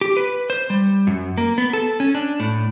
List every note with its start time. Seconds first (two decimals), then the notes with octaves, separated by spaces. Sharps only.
0.01 G4
0.17 B4
0.50 C5
0.70 G3
1.07 F#2
1.38 A#3
1.58 B3
1.73 A4
2.00 C#4
2.15 D4
2.40 A2